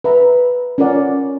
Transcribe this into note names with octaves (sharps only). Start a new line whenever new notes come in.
B4 E5 A#5
C#4 F4 A#4 D5 F#5